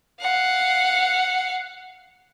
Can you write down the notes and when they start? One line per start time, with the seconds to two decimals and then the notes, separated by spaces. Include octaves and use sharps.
0.21 F5 F#5